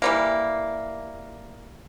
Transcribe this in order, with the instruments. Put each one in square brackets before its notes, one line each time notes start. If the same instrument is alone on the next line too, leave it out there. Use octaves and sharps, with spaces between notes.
[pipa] E3 G3 A#3